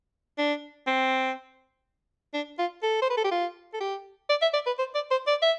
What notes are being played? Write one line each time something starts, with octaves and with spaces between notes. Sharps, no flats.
D4
C4
D4
F4
A4
C5
B4
A4
G4
F4
A4
G4
D5
E5
D5
B4
C5
D5
C5
D5
E5